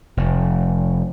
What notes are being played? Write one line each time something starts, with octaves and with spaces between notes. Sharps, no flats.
F1